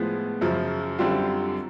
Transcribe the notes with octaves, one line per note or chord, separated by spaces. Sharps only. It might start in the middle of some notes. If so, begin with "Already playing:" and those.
Already playing: A2 F3 G#3 B3
F#2 C#3 F3
F#2 D3 G3 C4 F4